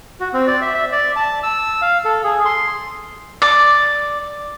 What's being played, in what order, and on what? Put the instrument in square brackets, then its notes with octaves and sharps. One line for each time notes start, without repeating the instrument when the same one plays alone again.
[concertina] F#4
C4
D5
E5
E5
D5
A5
E6
F5
A4
G#4
C6
[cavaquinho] D5 D6